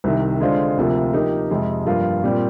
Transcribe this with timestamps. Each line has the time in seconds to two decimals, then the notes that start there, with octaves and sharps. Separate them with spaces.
0.04 C2 C3 D#3
0.40 D3 G#3 D4 F4 C5
0.77 D2 C3 F3 A#3 F4
1.13 F3 A#3 D#4 G4 A#4
1.50 F2 C3 F3 G#3
1.86 G2 F3 A#3 F4
2.24 A#2 G3 C4